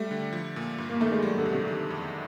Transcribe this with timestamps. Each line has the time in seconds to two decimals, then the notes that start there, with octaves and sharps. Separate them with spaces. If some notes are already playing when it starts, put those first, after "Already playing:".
Already playing: G3 A3
0.11 D3
0.33 F3
0.56 A#2
0.78 G2
0.89 A#3
1.00 D#3 A3
1.12 G#3
1.22 F#3 G3
1.38 D3
1.46 E2
1.53 C3
1.68 D#3
1.90 F2